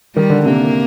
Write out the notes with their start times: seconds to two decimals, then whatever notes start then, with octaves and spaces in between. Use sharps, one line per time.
0.16 D#3 G3
0.30 D3
0.46 C3 A#3